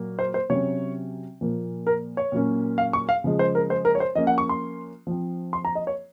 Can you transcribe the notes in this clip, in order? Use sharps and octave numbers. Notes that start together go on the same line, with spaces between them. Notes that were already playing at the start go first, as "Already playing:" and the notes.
Already playing: A#2 F#3 A#3
C5
C5
C3 F#3 C#4 C#5
A#2 F3 A#3
A#4
C#5
A#2 F#3 A#3 C#4
F5
C#6
F5
C#3 F3 G#3
C5
A#4
C5
A#4
C#5
C5
F3 A#3 C#4 D#5
F#5
C#6
C6
F3 C4
C6
A#5
D#5
C#5